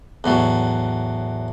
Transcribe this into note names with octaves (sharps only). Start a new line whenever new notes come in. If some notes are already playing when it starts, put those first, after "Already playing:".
E2 A2 F#3